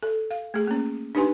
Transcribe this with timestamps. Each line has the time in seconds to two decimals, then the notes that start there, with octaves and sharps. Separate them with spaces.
0.03 A4
0.31 F5
0.54 A3 G#4
0.67 A#3 C#4
1.15 D4 D#4 G4 B4 G#5 C6